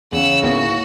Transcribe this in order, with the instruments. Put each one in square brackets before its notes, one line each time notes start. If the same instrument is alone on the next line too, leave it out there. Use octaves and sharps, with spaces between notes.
[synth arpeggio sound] E2 [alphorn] C#3 [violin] F#5 E6
[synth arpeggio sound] C#2 D3 B3 [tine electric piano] G#2 A#3 E4 [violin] F#4